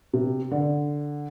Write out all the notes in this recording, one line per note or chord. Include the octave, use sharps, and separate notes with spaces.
C3
D3